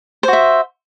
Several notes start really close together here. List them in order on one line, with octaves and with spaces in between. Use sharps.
C5 F#4 E5